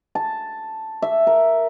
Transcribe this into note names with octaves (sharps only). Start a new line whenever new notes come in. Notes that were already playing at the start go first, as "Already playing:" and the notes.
A5
E5
A#4